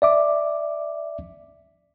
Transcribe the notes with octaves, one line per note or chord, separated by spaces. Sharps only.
D5 E5 D6